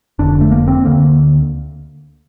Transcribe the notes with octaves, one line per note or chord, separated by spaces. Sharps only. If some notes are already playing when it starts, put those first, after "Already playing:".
F1 F2 D3 D4
A3
A#3
C4
D2 D3 A#3